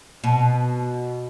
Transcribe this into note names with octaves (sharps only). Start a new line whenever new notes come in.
B2